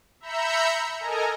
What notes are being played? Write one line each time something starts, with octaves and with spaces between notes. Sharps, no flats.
E5 A#5 B5 E6 G6 C#7
A4 A#4 D#5 G#5 A#5